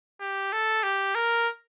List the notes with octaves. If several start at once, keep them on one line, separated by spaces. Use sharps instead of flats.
G4
A4
G4
A#4